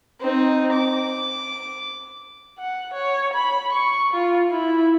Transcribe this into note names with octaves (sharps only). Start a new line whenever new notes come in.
C4 D#4
D6
F#5
C#5
B5
C#6
F4
E4